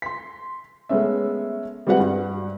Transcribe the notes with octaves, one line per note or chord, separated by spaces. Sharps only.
C6 B6
G#3 A3 B3 C#4 E5
G3 G#3 C4 F#4 B4 F#5
G2